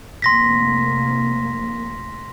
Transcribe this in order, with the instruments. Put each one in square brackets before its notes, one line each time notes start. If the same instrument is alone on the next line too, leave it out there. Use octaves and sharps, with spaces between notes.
[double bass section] F1 A#3 [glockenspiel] C6 A#6 B6